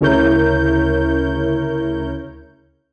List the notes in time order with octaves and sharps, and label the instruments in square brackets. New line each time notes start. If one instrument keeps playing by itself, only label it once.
[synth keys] D2 C#3 E4 A#4 C#5 G6